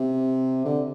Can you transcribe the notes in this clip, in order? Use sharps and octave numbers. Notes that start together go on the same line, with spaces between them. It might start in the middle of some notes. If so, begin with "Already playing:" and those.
Already playing: C3
D3